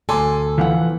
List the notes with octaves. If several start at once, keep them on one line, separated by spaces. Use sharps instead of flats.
D2 A4 G#5 C6 D6
E3 F3 B3 F5 F#5